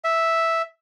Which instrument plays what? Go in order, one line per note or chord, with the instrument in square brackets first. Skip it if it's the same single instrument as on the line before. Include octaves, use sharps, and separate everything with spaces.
[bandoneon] E5